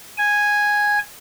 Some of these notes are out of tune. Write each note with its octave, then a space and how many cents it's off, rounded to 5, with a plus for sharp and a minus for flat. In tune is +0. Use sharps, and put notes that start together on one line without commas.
G#5 -5